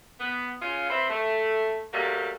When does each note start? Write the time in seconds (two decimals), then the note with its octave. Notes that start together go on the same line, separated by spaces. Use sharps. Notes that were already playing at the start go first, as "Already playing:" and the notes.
0.20 B3
0.62 C#3 C#4 F4
0.90 C4 E4 B4 C5
1.10 A3
1.93 F#3 G3 A3 A#3